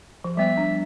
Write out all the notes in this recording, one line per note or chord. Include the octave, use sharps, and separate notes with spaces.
F3
G3 B3 E5
D4